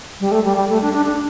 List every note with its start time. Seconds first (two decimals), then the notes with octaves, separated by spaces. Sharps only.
0.20 G3
0.32 A3
0.45 G3
0.57 G3
0.69 A3
0.82 D4
0.93 D4
1.06 D4